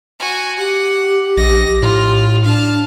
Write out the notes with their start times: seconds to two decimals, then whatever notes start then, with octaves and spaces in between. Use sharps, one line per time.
0.20 F#4 G#5
0.58 G4 F#5
1.37 A#1 D#5 A#6
1.82 A2 F4
2.44 D4 F5 A5